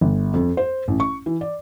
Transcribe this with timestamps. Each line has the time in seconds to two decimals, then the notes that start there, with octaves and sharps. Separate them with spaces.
0.01 G1
0.34 F2
0.57 C5
0.88 A1
1.00 C#6
1.26 E3
1.41 D5